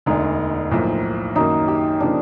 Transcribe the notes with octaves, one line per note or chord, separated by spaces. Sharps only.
E1 D2 D3 D#4
B1 A2 F3 A#3
F#2 D#3 F#3 A#3 D#4
G4
C#3 F3 A#3 D4